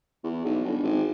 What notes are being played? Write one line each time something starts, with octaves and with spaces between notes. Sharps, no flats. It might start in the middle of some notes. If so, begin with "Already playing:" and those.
E2
B1
G1
G#1